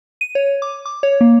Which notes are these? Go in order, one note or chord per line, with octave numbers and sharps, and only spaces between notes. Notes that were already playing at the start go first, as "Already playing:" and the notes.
D#7
C#5
D6
D6
C#5
A#3